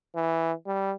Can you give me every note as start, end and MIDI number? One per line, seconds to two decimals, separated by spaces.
0.15 0.53 52
0.66 0.93 55